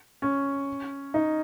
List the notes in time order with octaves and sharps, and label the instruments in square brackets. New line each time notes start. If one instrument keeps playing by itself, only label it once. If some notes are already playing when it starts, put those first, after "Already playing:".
[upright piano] C#4
D#4